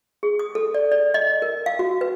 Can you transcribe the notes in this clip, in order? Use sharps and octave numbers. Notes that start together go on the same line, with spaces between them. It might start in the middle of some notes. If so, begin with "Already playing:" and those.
G#4
D#6
A4
D5
D5
D#5
A#4
F5
F#4
B4